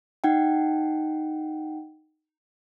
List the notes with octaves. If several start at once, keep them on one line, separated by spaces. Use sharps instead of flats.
D#4 F#5 G5